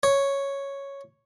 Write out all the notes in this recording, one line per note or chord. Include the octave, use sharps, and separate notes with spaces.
C#5